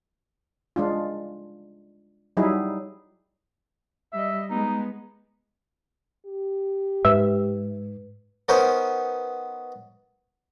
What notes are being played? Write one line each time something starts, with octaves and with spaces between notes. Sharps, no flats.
G#3 D4 F4
F#3 G3 D#4 E4 G#4
G3 D#5 E5
G#3 B3 D#4
G4
G#2 B4 E5
B3 C#4 D#4 A#4 C5 C#5